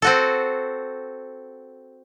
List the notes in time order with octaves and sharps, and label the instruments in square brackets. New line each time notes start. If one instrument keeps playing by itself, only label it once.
[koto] C4 F#4 A4